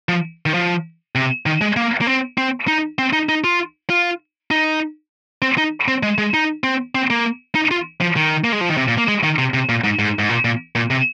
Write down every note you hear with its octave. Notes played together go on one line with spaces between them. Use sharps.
F3
D#3
F3
C3
D#3
G#3
A#3
A#3
C4
C4
D#4
C4
D#4
D#4
F4
F4
D#4
C4
D#4
C4
G#3
G#3
D#4
C4
C4
A#3
D#4
F4
F3
D#3
A#3
G#3
F3
D#3
C3
A#2
A#3
G#3
D#3
C3
C3
A#2
G#2
G#2
G#2
A#2
A#2
A#2
C3